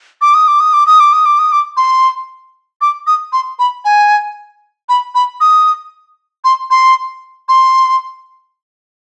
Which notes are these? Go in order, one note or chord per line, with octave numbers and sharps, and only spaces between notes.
D6
D#6
D6
D#6
D6
D#6
D6
D#6
D6
D#6
D6
C6
D6
D#6
C6
B5
G#5
B5
B5
D#6
C6
C6
C6